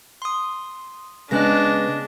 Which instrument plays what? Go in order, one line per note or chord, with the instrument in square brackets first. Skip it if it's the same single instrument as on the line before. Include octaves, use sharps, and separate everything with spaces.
[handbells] C6 D#6
[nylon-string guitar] C#3 G#3 B3 [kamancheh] D4 [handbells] D#5 F#6 A#6